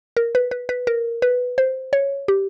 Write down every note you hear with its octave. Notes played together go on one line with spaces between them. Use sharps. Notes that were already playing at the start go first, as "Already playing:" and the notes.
A#4
B4
B4
B4
A#4
B4
C5
C#5
G4